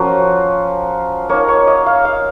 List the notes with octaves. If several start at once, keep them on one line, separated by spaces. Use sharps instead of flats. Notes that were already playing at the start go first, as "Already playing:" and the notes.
Already playing: F3 A#3 C#4 F4 F#4
A#3 D#4 C#5
C#5
D#5
F5
F5